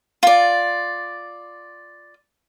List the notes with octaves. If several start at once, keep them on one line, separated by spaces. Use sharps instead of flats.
F4 D5